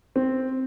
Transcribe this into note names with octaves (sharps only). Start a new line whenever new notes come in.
C4